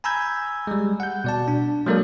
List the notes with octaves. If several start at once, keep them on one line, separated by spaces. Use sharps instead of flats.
G#5 A#5 B5 E6 G6 G#6
G3 G#3
F#5 G6
B2 D5 A5
D4
F#3 G#3 A#3 A4 A#4 D5